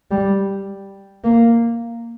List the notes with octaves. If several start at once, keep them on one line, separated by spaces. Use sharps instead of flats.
G3
A#3